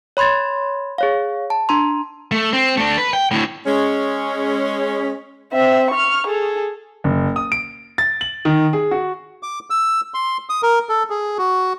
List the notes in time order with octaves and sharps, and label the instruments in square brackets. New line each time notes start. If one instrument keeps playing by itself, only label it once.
[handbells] C#5 B5 C6 G#6 A6
G#4 C#5 F5
A5
D4 A#5 C6
[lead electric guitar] A3
C4
A3 D4
B4
G5
D2 A2
[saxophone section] G#3 C#4
[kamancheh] C4 E5
C#6 F6
G#4 A4
[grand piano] F#1
D#6
D7
A6
F#7
D#3
G#4
F#4
[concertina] D6
E6
C6
D#6
A#4
A4
G#4
F#4